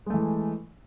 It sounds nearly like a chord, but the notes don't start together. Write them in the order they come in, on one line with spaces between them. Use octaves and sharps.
G#3 A3 E3